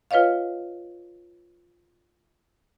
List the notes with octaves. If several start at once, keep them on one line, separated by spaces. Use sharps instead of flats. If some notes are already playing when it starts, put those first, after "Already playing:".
F4 B4 C#5 D#5 F5